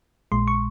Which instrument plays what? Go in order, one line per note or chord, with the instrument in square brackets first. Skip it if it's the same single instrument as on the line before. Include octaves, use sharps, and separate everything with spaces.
[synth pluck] A#1 A#2 G#3 C6
C#6